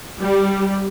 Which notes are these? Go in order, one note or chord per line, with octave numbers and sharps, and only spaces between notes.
G3